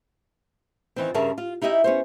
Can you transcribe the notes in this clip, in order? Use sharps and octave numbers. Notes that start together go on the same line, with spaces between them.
D#3 E3 C4
G2 C#3 G#4 A#4 E5 A5
F4
D#4 E4 G4 D#5 E5
B3 C#4 C5